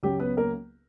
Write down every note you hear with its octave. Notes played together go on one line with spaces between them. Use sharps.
C#2 C#3 F#3 G4
B3 B4
A#3 A#4